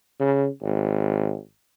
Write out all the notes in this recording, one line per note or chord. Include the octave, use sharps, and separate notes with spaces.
C#3
G#1